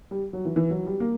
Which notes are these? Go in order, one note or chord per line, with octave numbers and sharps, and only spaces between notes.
G3
F#3
E3
E3
F#3
G3
A#3